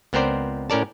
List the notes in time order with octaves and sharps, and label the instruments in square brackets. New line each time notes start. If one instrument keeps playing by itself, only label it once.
[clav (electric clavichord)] C#2 B3 C4 A#4 C5 D5
A2 C#4 A#4 D5 A5